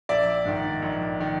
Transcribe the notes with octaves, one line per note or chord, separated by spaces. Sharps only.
A#1 D5 E5
G#2 D#3
A#1
D#3